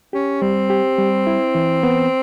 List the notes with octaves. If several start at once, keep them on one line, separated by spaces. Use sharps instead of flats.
C#4 G4
G3 C4
G4
G3
E4
E3
B3